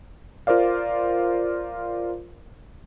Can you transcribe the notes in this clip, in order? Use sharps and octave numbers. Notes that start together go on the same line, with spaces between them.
F4 A#4 C5 D5 F5